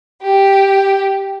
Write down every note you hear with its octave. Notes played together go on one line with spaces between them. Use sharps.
G4